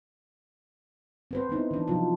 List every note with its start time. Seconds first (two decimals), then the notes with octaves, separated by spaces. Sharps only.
1.31 C4 B4 C5
1.49 B3 C4 D#4 E4
1.71 E3 D4
1.88 C3 F3 F#3 D#4 F4